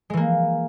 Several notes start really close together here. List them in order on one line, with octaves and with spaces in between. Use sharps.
G#3 E3 A#3